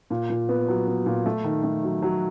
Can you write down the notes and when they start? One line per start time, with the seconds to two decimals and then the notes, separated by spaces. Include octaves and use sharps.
0.10 A#2
0.30 A#2
0.49 B3
0.68 F#3
0.87 B3
1.06 A#2
1.26 A3
1.44 D#3
1.64 A3
1.83 F#3
2.02 F#3